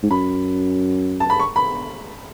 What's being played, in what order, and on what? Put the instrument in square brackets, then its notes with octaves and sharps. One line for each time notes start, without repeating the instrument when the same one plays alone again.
[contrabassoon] G#2
[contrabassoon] F#2 [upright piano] B5
[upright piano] A5
B5
C#6
B5